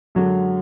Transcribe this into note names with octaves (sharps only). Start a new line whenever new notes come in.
F#2 D3 F#3 G#3